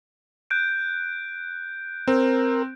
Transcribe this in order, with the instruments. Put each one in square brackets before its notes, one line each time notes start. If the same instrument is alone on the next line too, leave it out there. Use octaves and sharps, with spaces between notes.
[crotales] F#6 G6 D7
[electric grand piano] C4 [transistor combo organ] A#4